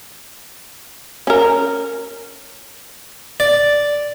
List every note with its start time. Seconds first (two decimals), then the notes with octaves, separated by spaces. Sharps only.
1.27 C#4 A#4
3.40 D5